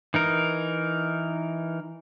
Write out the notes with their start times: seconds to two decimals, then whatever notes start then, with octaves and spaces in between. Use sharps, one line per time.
0.14 E3 D#4 A#4